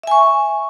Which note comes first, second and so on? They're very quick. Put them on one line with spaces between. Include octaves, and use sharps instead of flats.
E5 G#5 C#6